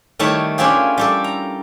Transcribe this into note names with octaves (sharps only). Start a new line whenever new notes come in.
D#3 G3 A3 E4 C#5 A5
C#4 D4 E4 F4 G4 G#4
G3 G4 A4
A#5